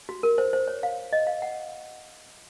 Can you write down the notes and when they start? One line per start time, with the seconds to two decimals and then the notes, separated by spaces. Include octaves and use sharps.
0.09 F#4
0.23 A#4
0.38 C5
0.53 C5
0.68 C#5
0.83 F5
1.13 D#5
1.27 F5
1.42 F#5